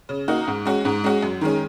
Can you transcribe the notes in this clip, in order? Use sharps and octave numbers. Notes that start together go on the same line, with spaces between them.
C#3
A#3 D#4 F#4
G#2
G#3 C#4 F#4
G#2
G#3 C#4 F#4
F#2
D#3 G#3 C#4